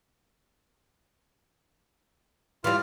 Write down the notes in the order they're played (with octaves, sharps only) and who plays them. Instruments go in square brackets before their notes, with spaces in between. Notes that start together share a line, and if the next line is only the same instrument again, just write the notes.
[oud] E3 G3 [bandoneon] F4 F6